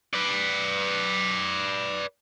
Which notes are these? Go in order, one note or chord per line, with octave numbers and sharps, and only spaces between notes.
B4 D5